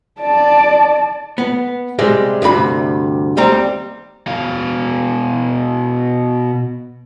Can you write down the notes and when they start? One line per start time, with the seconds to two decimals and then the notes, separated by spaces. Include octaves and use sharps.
0.21 D5 A5
1.38 B3
1.99 C3 G3 G#3
2.42 D2 G2 C3 B5
3.37 D#2 G3 C4 A#5
4.27 B2 F5